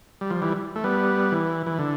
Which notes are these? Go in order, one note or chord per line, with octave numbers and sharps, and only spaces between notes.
G3
F3
E3 G3
A3
G3 B3
E3
E3
D3